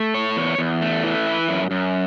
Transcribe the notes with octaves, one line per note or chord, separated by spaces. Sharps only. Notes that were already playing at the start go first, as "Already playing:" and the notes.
Already playing: A3
C#5
E2
E2
A3
E3
E4
F#2
F#2